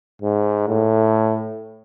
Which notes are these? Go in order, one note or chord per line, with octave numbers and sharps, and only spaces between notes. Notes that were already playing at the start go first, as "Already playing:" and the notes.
G#2
A2